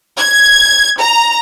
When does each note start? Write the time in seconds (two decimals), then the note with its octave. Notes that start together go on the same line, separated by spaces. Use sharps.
0.18 G#6
0.99 A#5